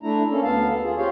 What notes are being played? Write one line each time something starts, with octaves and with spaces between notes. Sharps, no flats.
A3 D4 E4 A#5
A#3 C#4 A4
D2 B3 F5 A5
A4
F4 G#4
C4 F4 G4 C#5 F5